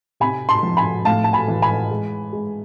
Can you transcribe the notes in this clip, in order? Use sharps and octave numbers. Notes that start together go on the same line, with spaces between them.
C3 G#5 B5
A5 C6
F3
G#5 B5
A2 F5 A5
A5
G#5 B5
E3
G#5 B5
G#3
G#3